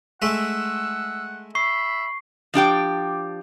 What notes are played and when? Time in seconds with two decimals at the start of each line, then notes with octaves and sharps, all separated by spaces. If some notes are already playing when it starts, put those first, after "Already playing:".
0.22 G#3 A3 E5 F#5 E6
1.55 E5 B5 C#6 C7
2.54 F3 D4 G4 G5